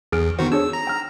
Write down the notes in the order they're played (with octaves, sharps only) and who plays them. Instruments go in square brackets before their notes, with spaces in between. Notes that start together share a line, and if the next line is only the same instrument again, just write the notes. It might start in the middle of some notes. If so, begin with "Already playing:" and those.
[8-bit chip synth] E2 [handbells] G#4 F6 D7
[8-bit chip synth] D#3 F#4 [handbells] B3 C5
[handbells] D4 G#4 C#5 [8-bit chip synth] E6
[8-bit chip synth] A#5
[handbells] G5 F6